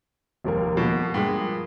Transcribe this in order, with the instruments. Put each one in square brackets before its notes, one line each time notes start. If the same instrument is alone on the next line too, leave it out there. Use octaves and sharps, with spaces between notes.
[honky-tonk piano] F1 D#2 A#4
[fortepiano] B2 [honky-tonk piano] F3 A#3
[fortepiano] G2 G#3